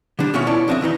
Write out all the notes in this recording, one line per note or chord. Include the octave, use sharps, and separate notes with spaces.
D3 G3 D4
B2 D#3 C#4 F4 C#5 E5
B2 E4 C#5 D5 A5
F2 D3 C4 D#5 E5
D#3 E3 G3 D#4